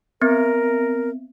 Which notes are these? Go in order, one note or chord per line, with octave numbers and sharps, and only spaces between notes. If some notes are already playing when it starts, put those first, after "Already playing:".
B3 C4 A#4